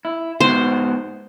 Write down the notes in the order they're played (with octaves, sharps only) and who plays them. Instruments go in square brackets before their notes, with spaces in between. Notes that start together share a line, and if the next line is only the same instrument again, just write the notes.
[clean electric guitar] E4
[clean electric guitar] G#2 B3 F#4 [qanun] C5